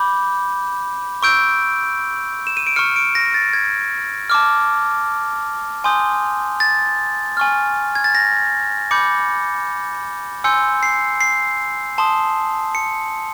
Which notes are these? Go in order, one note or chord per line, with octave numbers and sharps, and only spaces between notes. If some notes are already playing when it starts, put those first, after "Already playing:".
Already playing: B5 D6 G6
C#6 E6 G6 D7
E7
D#7
D7
C#6 F6 C#7
D7
A#6
A6
G#6
A5 D6 F6
G#5 C6 D#6 G6
A6
G#5 C#6 F6
G#6
A6
A#6
B5 D6 G6 C#7
G#5 C6 E6 G6 C#7
C7
C7
A5 C6 D#6
C#7